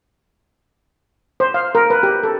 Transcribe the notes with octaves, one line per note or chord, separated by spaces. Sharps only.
C5
F5
A#4
B4
G4
A4